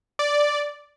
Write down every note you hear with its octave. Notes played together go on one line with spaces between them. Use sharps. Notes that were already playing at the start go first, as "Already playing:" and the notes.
D5